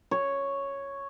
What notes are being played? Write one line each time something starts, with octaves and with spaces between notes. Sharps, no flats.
C#5